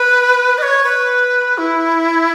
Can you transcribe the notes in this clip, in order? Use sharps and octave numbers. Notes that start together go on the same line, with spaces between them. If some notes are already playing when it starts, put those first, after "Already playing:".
Already playing: B4
D#5
C#5
B4
E4